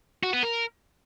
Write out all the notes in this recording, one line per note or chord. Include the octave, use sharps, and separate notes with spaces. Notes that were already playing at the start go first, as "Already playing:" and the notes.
F#4
B3
A#4